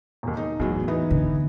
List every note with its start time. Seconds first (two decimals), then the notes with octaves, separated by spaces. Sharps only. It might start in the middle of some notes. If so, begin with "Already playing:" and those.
0.23 E1 D#2
0.37 D#4
0.60 E2 A2 F#3
0.88 E3 B3 D#4
1.11 D3